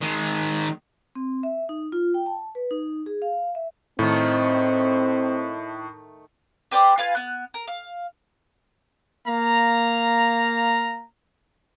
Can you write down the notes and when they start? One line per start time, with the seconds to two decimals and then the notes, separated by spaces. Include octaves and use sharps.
0.02 D#3 G#3
1.15 C4
1.43 E5
1.69 D#4
1.92 F4
2.14 G5
2.26 A5
2.55 B4
2.71 D#4
3.06 G#4
3.22 F5
3.55 E5
3.99 A2 D#3 A3 C4
6.71 G4 B4 C5 D5
6.98 F4 B4 F5 G#5
7.15 B3 F#6
7.54 A#4
7.68 F5
9.27 A#3 F5 A#5